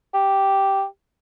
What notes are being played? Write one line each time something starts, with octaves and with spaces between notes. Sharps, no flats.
G4